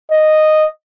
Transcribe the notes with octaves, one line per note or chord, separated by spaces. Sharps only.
D#5